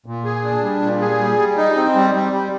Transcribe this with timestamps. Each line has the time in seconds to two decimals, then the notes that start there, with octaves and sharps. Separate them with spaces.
0.06 A#2
0.25 G#4
0.45 D4
0.63 G3
0.82 A#2
1.01 G#4
1.20 G3
1.39 G3
1.57 D#4
1.76 C4
1.95 G3
2.15 G3
2.33 G3